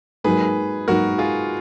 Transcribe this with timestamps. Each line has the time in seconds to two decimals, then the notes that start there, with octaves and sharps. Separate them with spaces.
0.24 G#2 F#3 A#3 G#4 B4
0.87 G#2 F#3 A#3 F#4 A#4
1.18 F4 G#4